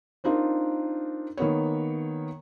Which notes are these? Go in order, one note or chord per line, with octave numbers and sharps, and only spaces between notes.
C4 D4 D#4 F4 A#4
D#3 A#3 B3 C#5